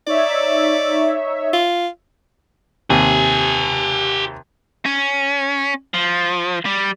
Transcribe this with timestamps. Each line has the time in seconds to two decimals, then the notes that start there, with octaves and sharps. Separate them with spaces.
0.07 D#4 C#5 D5 E5
1.53 F4
2.90 D#2 C3 G4 G#5
4.86 C#4
5.94 F3
6.65 G3